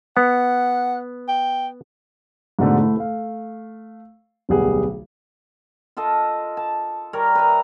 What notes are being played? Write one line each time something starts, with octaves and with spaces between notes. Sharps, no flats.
B3 F#5
G5
G#2 B2 D3 A3
A3 E4
A3 F5
D1 B1 G3 B3 G#4 F#5
F4 A4 D#5 A5
A5
G3 A#4 C#5 D5
B4 E5 A#5